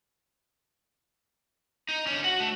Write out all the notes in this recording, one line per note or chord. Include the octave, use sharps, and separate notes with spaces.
D#4
D3 C#4
F#4 F#5
A3